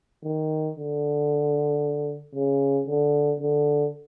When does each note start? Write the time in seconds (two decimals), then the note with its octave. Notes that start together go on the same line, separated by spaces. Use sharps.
0.24 D#3
0.77 D3
2.35 C#3
2.88 D3
3.40 D3